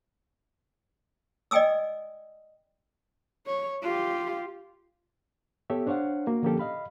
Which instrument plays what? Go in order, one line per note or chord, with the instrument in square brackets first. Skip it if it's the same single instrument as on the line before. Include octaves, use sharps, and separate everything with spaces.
[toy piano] D5 D#5 G5 G#5 D#6 E6
[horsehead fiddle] C#5
F4 G4
[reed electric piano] B3 G4 A4 C#5 E5
D4 C5 C#5 F5 F#5
A#3 F#4
D3 F3 A#3 C#4 G4 A4
D#5 F5 B5